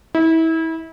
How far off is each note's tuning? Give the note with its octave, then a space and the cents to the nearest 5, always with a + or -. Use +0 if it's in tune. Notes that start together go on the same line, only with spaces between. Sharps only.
E4 -30